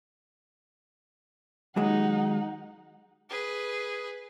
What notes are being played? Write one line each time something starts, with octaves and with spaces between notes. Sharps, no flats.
D#2 F#3 G#3 D#4 F#5
G#4 B4